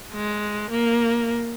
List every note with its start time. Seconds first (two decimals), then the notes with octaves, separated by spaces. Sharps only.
0.12 G#3
0.71 A#3